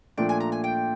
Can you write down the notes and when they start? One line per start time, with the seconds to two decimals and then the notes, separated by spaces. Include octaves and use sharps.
0.18 A#2 F3 A3 D4 G5
0.29 G#5
0.40 A#5
0.52 G#5
0.64 G5